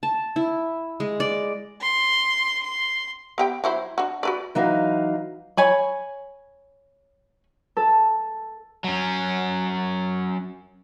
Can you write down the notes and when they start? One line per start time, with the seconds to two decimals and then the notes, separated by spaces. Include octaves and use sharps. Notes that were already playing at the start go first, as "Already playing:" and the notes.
0.03 A5
0.36 E4
1.00 G#3
1.20 D5
1.81 C6
2.64 C6
3.38 B3 G4 G5
3.64 F#3 E4 C5
3.98 D4 F#4
4.23 F#4 B4 D5
4.55 E3 F#3 D#4 F5
5.57 C#5 G#5 B5
7.77 A4
8.84 F#3 C#4